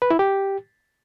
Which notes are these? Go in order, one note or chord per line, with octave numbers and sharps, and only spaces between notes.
B4
E4
G4